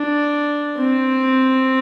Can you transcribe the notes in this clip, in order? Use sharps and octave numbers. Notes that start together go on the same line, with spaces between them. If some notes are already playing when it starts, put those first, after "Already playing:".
Already playing: D4
C4